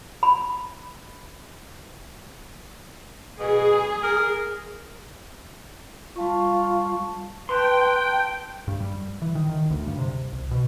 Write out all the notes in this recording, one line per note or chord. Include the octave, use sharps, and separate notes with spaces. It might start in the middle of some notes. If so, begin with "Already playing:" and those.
B5
B2 G#4
A#4
G3 F4 A5 C#6
B4 G5 A5 A#5 C6
G2
G3
E3
D#3
D#3
D2
G2
C3
C2
B2